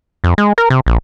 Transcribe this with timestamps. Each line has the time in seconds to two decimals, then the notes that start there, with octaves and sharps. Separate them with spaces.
0.24 F2
0.38 G#3
0.58 A#4
0.70 C3
0.87 A#1